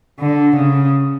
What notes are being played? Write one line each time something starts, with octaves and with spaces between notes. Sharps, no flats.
D3
C#3